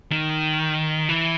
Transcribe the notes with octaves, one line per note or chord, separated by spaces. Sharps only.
D#3
E3